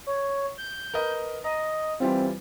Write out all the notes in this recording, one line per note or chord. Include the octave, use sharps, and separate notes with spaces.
C#5
G6
A#4 B4 D#5
D#5 A#5
E3 G3 C4 F4